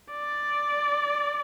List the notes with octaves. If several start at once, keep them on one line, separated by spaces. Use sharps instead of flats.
D5